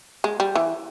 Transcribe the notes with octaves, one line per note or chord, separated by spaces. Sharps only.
G#3
G3
E3